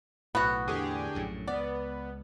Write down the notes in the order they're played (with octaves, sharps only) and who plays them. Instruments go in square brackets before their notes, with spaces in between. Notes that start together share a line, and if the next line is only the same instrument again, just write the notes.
[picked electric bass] B1 A2 [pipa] B3 F#4
[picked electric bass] E2 A2 [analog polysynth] D3 G4 G#4
[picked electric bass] A#1 F#2 A2
[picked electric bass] C#2 [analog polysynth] B3 [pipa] D5